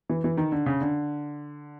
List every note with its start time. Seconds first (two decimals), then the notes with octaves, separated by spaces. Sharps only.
0.10 E3
0.24 E3
0.37 D#3
0.52 D3
0.66 C#3
0.81 D3